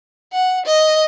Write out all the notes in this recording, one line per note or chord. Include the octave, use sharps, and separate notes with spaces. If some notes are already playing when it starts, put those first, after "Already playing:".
F#5
D#5